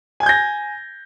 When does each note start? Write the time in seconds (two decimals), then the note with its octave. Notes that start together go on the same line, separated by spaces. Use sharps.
0.20 G#5
0.23 G#6
0.26 G6
0.29 A#6